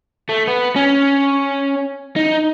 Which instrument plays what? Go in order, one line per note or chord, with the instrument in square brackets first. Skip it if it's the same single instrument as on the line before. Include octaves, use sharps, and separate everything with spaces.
[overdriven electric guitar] A3
B3
C#4
D#4